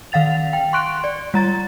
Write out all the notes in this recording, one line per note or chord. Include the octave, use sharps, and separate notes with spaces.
D#3 F5 F#5 A6 F7
G5
C6 C#6 F#6 D7
D5
G3 A#5 A6